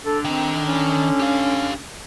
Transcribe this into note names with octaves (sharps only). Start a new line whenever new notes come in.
D3 A4
D#3 C4
C#4
G4 F5